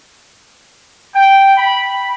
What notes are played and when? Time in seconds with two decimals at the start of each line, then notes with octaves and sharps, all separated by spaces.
1.15 G5
1.58 B5